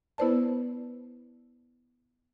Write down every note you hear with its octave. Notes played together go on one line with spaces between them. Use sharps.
B3 E4 B4 C5 D5 A5